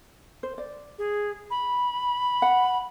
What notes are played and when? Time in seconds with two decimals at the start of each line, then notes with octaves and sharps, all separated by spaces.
0.43 C5
0.58 D5
0.98 G#4
1.51 B5
2.42 F#5